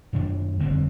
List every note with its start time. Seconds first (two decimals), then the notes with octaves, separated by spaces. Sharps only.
0.13 F#2 D#3 D4
0.59 F1 D3 G3 C4